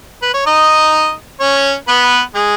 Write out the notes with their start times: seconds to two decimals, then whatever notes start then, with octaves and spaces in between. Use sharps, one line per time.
0.22 B4
0.34 C#5
0.46 D#4 D#5
1.40 C#4 C#5
1.88 B3 B4
2.35 G#3 G#4